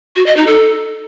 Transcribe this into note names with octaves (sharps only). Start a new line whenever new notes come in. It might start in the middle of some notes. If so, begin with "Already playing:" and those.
F#4
D#5
D#4
A4